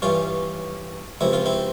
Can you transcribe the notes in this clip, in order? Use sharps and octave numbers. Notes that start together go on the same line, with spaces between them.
G2 E3 C#4 F4
C#2 C3 F3 E4
F4
C4 E4